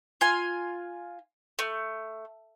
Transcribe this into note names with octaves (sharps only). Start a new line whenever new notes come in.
F4 G#5
A3